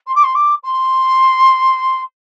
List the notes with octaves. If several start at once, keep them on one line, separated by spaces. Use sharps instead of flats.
C6
D6
C6
D6
C6